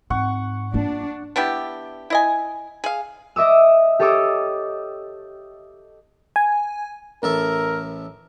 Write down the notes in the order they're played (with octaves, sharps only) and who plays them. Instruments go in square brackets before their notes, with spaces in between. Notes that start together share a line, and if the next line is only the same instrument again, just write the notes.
[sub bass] G#2 [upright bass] C4 [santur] F#5 C#6
[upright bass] A#3 F4 [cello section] D4
[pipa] B3 D4 E4 G4
E4 D#5 G#5
G#4 F5
[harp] D#5 E5 D6 E6
G4 A4 C#5 D#5 D6 E6
[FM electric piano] G#5
[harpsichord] A1 A4 E5 [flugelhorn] A#4